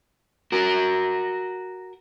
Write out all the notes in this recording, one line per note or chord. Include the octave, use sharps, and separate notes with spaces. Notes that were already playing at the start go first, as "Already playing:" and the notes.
F#4 A#4